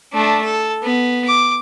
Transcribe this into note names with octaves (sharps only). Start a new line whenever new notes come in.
A3 D4
A4
B3
D6